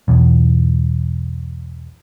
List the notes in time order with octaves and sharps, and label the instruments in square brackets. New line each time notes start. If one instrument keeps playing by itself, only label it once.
[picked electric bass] B1 E2